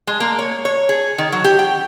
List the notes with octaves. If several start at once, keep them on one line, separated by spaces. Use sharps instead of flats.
G#3
A#3
C#5
C#5
G#4
D#3
F#3
G4
G5